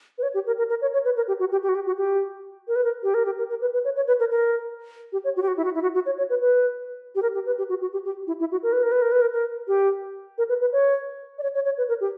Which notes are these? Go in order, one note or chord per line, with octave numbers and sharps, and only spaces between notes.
B4
C#5
G4
A#4
A#4
A#4
C#5
C#5
B4
A#4
G4
F#4
G4
G4
F#4
G4
F#4
G4
A#4
B4
A#4
G4
A#4
G4
A#4
A#4
B4
B4
C#5
C#5
B4
A#4
A#4
G4
C#5
F#4
G4
F#4
E4
F#4
E4
F#4
F#4
C#5
C#5
B4
B4
G4
A#4
G4
B4
G4
F#4
F#4
G4
G4
E4
E4
F#4
A#4
B4
A#4
B4
A#4
B4
A#4
A#4
G4
A#4
B4
B4
C#5
D5
C#5
C#5
C#5
B4
A#4
G4